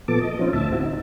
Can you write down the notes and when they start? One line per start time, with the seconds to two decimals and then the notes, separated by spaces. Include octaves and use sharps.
0.08 A#2 F3 B3 A4 A5 D6
0.21 D#5
0.39 F3 C4 C#4 D#4 F4
0.53 D2 A2 E5 A5
0.72 C4 E4 F#4
0.85 D#4